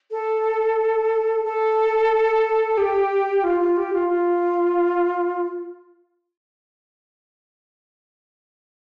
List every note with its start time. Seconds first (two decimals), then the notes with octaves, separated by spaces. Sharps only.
0.11 A4
1.45 A4
2.78 G4
3.44 F4
3.60 F4
3.77 G4
3.93 F4
4.09 F4